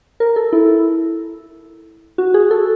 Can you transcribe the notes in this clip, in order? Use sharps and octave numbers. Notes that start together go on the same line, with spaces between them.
A#4
A4
E4
F#4
G#4
A4